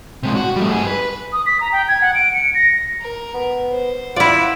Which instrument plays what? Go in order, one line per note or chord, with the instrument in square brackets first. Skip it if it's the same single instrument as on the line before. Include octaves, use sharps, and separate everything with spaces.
[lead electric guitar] C3 G#3
F#4
G3 A3
G2 G#4
B4
[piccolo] D#6
B6
A#5
G5
G#6
F#5
D7
C#7
A#6
[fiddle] A#4
[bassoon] B3
[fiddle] C5
[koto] E4 D5 [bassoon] F4 [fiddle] F#5 B5